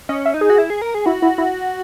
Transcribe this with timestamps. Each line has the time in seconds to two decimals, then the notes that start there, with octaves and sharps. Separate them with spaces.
0.09 C#4 D#5
0.26 E5
0.34 D#4
0.41 G#4
0.50 F#4
0.58 E4
0.70 G#4
0.82 A#4
0.94 G#4
1.06 E4 F#4
1.22 E4
1.38 E4